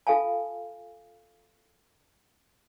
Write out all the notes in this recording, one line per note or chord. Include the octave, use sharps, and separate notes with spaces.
F4 A4 F5 G#5 A5